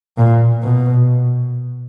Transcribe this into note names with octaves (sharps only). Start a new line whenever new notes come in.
A#2
B2